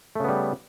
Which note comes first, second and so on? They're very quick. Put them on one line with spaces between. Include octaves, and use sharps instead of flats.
A3 C#3 B3 G3